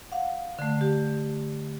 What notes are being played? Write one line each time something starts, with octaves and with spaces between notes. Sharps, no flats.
F5 F#5
D3 A3
G4